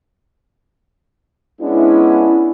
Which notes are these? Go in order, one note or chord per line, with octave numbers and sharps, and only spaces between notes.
G#3 B3 C#4 D4 E4